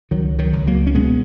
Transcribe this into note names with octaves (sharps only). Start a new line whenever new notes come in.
C#2 D#3 F#3
D#3 F#3
C#2
F#3 A#3
C#4
B2 G#3 B3